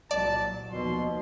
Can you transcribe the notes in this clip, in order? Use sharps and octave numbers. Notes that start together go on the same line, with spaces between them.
C2 A#2 F#3 D5 A5
D#2 B2 F3 C6